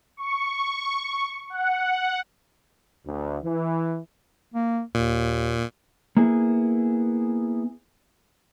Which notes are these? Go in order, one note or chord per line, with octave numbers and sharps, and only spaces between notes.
C#6
F#5
D2
E3
A#3
D#2 A#2
A#3 B3 E4 G#4